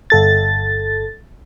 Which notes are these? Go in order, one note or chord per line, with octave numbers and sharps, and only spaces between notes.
G1 A4 A6